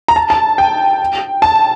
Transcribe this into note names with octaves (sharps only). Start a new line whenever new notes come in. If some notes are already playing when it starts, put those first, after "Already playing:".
A#5
A5
A5
G5
A5